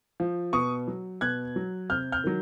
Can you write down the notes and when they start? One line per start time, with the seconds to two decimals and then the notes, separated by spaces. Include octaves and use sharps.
0.20 F3
0.53 B2 C#6 D#6
0.88 F#3
1.21 B2 F#6 G#6
1.56 F#3
1.90 C3 F6 G6
2.12 F6 G6
2.24 D#3 F#3